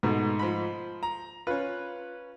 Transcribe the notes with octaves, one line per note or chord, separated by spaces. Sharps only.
G#2 B2 A3
F3 B5
A#5
C#4 F4 B4